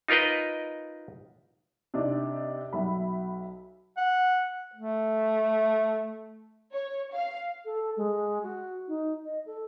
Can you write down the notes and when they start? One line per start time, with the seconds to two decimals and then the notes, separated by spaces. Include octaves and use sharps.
0.08 D#4 F4 A#4 B4 D#5
1.94 C3 D4 D#4 D5
2.73 B1 E5 B5
3.97 F#5
4.75 A3
6.72 C#5
7.14 F5
7.65 A4
7.97 G#3
8.43 F#4
8.88 D#4
9.26 D#5
9.46 A4